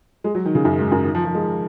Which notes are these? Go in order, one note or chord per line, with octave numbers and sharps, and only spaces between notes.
G#3
F#3
D#3
C#3
F#2
G#2
F#2
D#3
F3
F3
G#3